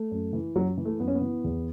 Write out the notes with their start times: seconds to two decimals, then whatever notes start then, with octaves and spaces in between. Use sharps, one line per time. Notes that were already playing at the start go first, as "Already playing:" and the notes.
Already playing: A3
0.11 F#2
0.33 E3
0.55 F#2 F#3
0.77 E3
0.85 A3
0.99 F#2 B3
1.08 C#4
1.15 B3
1.21 E3
1.44 E2